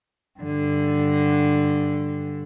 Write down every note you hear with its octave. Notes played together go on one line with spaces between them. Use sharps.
G2 D3